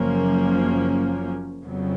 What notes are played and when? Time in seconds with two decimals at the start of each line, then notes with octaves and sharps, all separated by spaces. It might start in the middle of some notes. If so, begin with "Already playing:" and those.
Already playing: F#1 F#2 F3 A#3 C#4
1.65 F2 C#3 F#3 B3